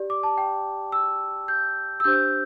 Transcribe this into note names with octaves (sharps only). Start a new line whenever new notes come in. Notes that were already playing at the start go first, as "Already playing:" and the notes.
Already playing: G4 D5
D6
A5
G5
E6
G6
E6
D4 G4 C5 G6